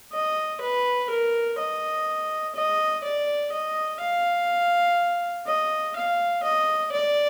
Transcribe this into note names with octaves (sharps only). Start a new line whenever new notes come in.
D#5
B4
A#4
D#5
D#5
D5
D#5
F5
D#5
F5
D#5
D5